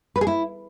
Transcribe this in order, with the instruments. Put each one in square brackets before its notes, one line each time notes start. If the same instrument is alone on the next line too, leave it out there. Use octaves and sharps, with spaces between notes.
[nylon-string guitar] B4
G#4
E4